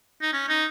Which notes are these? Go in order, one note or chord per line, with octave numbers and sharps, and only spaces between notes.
D#4
C#4
D#4